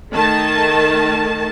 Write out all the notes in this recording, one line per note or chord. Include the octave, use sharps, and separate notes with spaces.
D#3 A3 A5